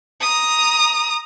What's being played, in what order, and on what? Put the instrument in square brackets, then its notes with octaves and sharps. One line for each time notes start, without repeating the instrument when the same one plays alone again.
[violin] A#5 D#6